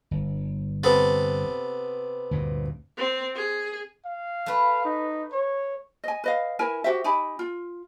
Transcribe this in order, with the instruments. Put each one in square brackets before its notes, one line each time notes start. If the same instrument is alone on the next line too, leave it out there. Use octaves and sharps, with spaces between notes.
[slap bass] G1
[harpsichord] C3 B3 A4
[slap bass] D2 G2 A#2
[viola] C4
G#4
[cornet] F5
[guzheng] A3 B4
[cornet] D#4
C#5
[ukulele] D#5 G#5
B4 D#5 F5
E4 A#4 B4 G#5
F#4 G4 C5 E5
D#4 G4 G#5 B5
F4